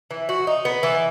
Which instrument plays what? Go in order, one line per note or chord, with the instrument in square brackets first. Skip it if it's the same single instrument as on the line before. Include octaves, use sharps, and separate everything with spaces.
[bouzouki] E3
F#4
D#4
B3
E3